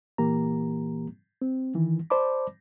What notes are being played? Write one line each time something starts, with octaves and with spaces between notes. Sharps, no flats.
A#2 E3 A#3 G4 A#5
C4
D#3 E3
C5 D5 A5 B5 D6